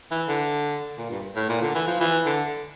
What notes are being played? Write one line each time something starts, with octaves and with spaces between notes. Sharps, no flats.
E3
D3
A#2
G2
A2
A#2
D3
E3
F3
E3
D3